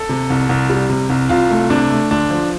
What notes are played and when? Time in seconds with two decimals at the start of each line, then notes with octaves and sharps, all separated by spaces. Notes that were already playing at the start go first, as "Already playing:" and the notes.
Already playing: A4
0.09 C3
0.30 C2
0.49 C2
0.70 G3
0.90 C3
1.10 C2
1.29 C2 F4
1.51 A3
1.70 C3 D4
1.90 A3
2.11 D2 D4
2.30 F3